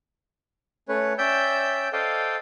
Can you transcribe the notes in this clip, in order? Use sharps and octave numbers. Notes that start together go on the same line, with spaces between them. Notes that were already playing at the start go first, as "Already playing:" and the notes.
A3 C#4 B4 C#5
C#4 D5 E5 G5 E6 G6
A4 C5 D5 D#5 F5 G5